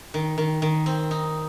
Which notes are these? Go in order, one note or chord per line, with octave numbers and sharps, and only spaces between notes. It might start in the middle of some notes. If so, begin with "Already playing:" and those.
D#3
D#3
D#3
C4
D#4